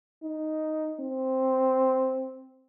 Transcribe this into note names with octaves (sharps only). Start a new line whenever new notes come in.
D#4
C4